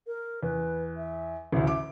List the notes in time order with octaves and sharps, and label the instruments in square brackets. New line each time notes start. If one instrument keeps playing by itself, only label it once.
[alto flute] A#4
[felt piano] E2 [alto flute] B4
[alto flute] E5
[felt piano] A1 D2 [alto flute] E5
[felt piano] D6